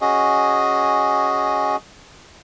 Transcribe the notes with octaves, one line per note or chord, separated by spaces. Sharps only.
C#4 F#4 G#4 D#5